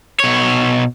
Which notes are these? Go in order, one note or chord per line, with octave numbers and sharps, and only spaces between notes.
B2 C#5